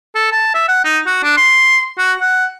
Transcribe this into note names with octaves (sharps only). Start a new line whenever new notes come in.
A4
A5
E5
F#5
D#4
F#4
D4
C6
F#4
F#5